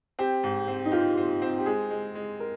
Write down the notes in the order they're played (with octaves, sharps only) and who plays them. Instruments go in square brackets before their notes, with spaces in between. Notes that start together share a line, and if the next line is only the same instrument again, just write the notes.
[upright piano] C4 [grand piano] G4
[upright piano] G#2
C4
[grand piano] D#4
[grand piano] F4 [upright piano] G4
[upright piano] C4
C4
[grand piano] G4
[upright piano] G#3 [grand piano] G#4
[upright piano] G#3
G#3
[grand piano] A#4